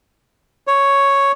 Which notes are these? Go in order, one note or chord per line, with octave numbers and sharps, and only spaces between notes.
C#5